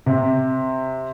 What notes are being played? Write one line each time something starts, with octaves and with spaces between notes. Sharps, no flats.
C3